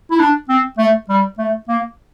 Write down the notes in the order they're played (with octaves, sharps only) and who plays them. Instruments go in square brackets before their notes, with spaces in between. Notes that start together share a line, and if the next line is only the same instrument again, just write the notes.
[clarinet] E4
D4
C4
A3
G3
A3
A#3